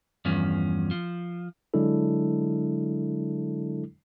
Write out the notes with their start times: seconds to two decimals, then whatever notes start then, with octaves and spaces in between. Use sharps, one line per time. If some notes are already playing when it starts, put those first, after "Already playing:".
0.25 E2 G2 F3 C#4
0.91 F3
1.74 D3 F#3 G#3 D4 E4 A4